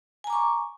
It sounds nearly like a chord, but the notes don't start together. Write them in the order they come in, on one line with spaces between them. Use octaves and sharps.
G#5 A#5 D6 C#6